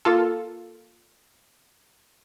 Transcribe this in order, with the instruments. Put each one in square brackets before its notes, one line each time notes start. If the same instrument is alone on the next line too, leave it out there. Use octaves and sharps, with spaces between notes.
[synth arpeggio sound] A#3 F4 A4